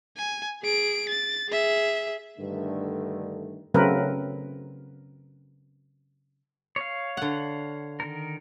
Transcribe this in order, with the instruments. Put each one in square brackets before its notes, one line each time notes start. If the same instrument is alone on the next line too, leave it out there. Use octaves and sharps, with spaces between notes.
[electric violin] G#5
G#4 D7
A6
G#4 E5
[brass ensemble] G2 D3 D#3 A3
[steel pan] C#3 F#3 A3 C4 A#4 B4
[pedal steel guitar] C#5 F5
[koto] D3 F#5
[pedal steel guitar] D#3 A#4